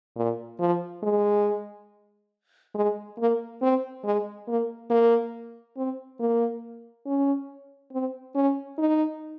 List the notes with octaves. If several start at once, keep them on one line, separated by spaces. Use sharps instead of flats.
A#2
F3
G#3
G#3
A#3
C4
G#3
A#3
A#3
C4
A#3
C#4
C4
C#4
D#4